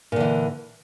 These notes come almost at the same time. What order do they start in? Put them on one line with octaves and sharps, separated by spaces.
A#2 D3 E3